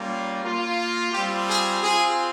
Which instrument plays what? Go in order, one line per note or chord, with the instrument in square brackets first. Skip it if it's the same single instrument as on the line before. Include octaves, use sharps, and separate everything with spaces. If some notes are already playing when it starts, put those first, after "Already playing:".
Already playing: [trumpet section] G3 A#3 C#4 F4
A#3 F4
G3 C4 F4 G4
G#4
C4 F4 G#4